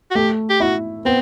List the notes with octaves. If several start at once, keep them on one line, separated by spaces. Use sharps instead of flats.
F#4
A3 G4
G4
E4 F#4
B3 C4